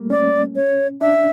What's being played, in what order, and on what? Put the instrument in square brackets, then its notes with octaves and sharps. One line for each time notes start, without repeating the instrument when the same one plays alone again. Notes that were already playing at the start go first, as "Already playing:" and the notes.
Already playing: [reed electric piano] G3 A3 A#3
[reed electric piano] C#4 [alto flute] D5
[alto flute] C#5
[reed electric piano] D4 [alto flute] E5